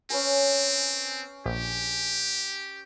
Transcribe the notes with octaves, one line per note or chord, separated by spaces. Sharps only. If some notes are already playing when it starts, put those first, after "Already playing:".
C4 C#4 B4 G#5
A#1 G4